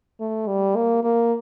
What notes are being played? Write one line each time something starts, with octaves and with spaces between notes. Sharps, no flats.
A3
G3
A#3
A#3